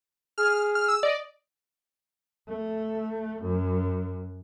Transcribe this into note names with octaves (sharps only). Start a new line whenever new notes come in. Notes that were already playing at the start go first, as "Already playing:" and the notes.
G#4 F6
F6
E6
D5 D#5
A3
F#2